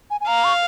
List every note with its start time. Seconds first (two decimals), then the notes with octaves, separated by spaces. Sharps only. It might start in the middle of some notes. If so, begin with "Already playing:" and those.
0.10 G#5
0.21 G#5
0.27 F5 A#5
0.44 C#6